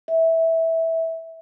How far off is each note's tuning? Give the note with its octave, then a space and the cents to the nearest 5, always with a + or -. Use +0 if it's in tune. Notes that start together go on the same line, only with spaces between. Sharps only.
E5 -10